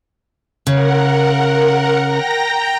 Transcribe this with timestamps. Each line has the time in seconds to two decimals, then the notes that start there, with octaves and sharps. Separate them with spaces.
0.67 C#3 A#4 F#5
2.05 G5 A#5 A#6